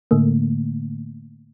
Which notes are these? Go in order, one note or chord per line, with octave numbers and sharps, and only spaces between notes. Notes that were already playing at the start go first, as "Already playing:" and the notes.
A2 D3 A3 A#3